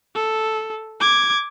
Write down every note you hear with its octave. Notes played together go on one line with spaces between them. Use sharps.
A4
D6 G#6